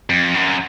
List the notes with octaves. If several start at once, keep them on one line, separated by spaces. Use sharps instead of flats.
F2
F#2